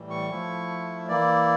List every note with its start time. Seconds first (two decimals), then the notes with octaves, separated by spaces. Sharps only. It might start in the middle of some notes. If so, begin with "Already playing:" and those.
Already playing: A2 E3 G3
0.10 C#6
0.30 F3 A3 E4
1.08 E3 A#3 E4 D5